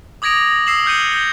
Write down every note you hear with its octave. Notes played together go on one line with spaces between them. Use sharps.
D6 D#6 G#6 A#6 D7 F7
D#6 E6 C7 E7 F#7
F6 G6 C#7 D#7 G7
G6 G7